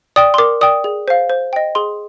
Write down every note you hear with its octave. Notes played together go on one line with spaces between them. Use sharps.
D5 G5 D#6
C6
A#4 D6
D5 G5 D#6
G#4
C5 F5
C5
D#5 G5
G#4 C6